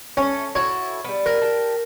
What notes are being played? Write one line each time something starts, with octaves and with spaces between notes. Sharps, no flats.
A3 C#4
E4 F#4 A4 C#5
G3 B3
A#4
G4 A5